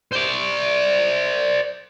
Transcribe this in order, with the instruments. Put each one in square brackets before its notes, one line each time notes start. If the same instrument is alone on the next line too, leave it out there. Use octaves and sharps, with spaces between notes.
[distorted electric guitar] C5 D5